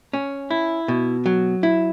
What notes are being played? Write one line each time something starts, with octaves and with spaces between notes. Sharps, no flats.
C#4
E4
B2
F#3
E4